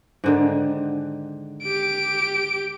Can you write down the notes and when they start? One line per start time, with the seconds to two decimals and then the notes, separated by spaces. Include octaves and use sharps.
0.24 G#2 D3 D#3
1.63 G4 D7